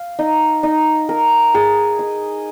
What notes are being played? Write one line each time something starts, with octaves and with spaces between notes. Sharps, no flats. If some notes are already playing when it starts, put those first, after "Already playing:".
Already playing: F5
D#4
D#4
A#4
G#4
D#5